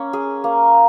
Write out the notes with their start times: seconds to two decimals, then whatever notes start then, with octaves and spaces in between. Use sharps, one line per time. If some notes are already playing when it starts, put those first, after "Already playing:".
Already playing: A#3 C#4
0.13 G#4
0.44 A#3